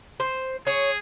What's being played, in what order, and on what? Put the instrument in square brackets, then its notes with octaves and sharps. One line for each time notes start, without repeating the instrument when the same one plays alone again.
[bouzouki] C5
[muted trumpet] G#4 [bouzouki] C#5